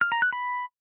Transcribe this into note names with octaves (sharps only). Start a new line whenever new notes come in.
F6
A#5
F#6
B5